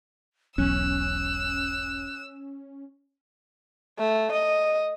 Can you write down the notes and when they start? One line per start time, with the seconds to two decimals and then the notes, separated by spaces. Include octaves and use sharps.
0.58 E1 B1 C#4 E6 F#6
3.99 A3
4.32 D#5